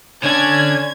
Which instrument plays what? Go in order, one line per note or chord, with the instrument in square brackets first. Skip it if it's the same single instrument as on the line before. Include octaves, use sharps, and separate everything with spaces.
[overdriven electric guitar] D3 D4 [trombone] C#4 [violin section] G#6